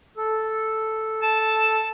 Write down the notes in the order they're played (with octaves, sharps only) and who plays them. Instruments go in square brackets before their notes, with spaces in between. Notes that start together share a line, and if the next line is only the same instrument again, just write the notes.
[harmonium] A4
[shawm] A5